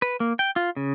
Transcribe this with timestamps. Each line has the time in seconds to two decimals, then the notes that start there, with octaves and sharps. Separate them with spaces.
0.02 B4
0.20 A#3
0.39 G5
0.56 F4
0.76 C#3